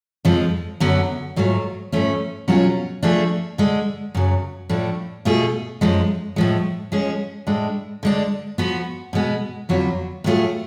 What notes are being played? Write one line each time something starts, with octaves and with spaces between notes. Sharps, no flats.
F2 F3 G#3
F#2 D3 F#3 B3
G#2 F#3 A3 F4
G#2 F3 A3 C#4
B2 F#3 C#4 F4 G#4
F3 A3 D4 G#4
D3 G#3 D4
F#2 C#3 F#3
A2 F3 A3 D4
B2 A3 F4 G#4
F#2 F3 G#3
A2 F3 G#3
F3 G#3 C#4 G#4
A2 G#3 D4
D3 G#3 D4
F3 B3 F#4
B2 G#3 B3
F2 D3 F#3 B3 F4
A2 F#3 A3 F4 G#4